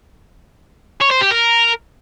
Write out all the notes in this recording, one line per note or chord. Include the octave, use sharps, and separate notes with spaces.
C#5
C5
G4
A#4